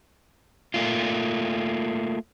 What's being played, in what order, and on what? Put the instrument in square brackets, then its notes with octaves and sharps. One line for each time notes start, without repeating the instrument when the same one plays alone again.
[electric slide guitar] A3 A#3 F4